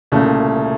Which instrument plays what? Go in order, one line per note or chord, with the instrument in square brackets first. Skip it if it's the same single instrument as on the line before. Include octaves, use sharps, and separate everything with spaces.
[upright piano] C2 A#2 A3 [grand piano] C#3